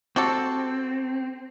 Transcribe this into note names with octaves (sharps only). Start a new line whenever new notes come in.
C4 F#4 G4 A4